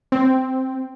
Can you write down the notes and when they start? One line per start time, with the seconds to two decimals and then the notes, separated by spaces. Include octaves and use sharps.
0.12 C4